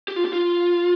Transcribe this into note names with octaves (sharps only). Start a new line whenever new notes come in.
G4
F4
G4
F4